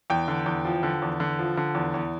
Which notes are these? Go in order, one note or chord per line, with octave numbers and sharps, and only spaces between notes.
E2 G5
D3
E2
F3
D3
E2
D3
F3
D3
E2
E2